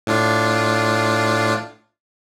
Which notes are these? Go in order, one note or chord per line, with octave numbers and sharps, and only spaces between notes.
A2 D4 F4